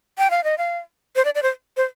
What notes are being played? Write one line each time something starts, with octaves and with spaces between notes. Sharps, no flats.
G5
F5
D#5
F5
C5
D5
D5
C5
C5